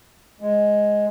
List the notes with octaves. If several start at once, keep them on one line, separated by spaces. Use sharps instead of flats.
G#3